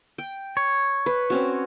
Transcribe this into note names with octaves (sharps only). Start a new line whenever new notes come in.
G5
C#5
B4
C4 C#4 F#4